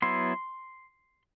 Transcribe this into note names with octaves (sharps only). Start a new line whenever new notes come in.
F#3 B3 E4 C6